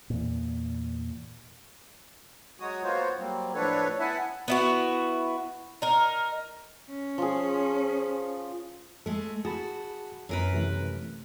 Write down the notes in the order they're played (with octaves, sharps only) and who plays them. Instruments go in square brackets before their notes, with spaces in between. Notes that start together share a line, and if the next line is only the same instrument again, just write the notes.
[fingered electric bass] E2 A#2
[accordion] F#3 G#3 F#4 C#5 D#6
A#3 B3 F4 F#4 C5 C#5
F#3 G3 A#3 C4
A2 F3 D4 A4 B4 C#5
B3 E4 E5 F#5 G#5 A5
[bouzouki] B3 E4 F#4
D#4 A#4
[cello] C#4
[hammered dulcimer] F3 G#4
[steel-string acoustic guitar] G#3 A3 [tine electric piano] A4
[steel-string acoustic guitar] F#4 [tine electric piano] G#4 A5 B5
[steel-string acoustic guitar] F#2 A#4 B4
[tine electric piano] C3 E3 A3